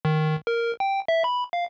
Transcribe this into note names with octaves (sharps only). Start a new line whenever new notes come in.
D#3
A#4
G5
E5
B5
F5